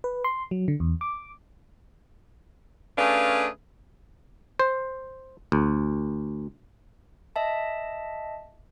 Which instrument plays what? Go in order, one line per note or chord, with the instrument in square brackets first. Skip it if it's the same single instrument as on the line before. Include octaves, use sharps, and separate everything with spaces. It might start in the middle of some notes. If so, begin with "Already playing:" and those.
[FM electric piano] B4
C6
F#3
D3
E2
D6
[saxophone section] A3 C#4 D4 G#4 B4 F5
[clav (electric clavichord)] C5
D2
[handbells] D#5 E5 A5